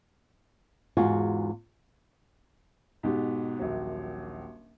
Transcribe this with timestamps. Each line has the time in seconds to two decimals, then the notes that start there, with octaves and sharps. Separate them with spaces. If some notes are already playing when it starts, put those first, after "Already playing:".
0.97 E2 G#2 F4 F#4 G#4
3.03 G#2 B2 G4
3.59 D#1 A#1 F#3